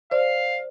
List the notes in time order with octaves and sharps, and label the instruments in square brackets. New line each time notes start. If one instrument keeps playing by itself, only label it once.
[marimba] C5 D5 [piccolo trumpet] F5